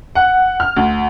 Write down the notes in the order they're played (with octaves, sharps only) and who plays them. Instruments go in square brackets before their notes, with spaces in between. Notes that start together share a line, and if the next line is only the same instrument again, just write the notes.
[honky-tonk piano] F#5
F6
D2